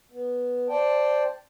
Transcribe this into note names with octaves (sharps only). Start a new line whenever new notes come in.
B3
C5 D5 G5 A5